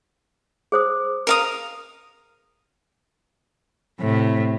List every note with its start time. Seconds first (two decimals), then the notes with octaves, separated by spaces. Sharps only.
0.72 G#4 C5 D#6
1.27 A#4 F5 D#6
4.00 A2 C3